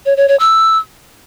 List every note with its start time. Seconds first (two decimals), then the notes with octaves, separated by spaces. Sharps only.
0.06 C#5
0.17 C#5
0.28 C#5
0.40 E6